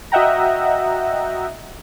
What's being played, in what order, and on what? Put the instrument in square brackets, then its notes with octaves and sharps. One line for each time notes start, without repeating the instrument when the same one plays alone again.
[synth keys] F#4 D#5 E5 F#5 G5 A#5